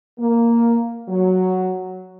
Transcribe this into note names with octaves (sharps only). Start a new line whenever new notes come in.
A#3
F#3